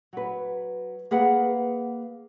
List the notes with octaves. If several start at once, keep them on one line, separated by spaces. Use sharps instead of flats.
F#3 B4
A#3 G#4 B4 F#5